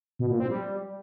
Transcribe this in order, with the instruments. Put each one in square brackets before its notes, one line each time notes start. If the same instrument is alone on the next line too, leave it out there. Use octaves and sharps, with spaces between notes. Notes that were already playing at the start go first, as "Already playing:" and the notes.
[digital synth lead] B2
A#2
C4
G3